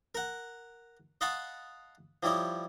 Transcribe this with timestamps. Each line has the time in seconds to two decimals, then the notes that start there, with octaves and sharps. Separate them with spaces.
0.15 A#4 F#5
1.21 D#5 F5 F#5 A5 B5 C#6
2.23 F3 G3 E4 C#5 D#5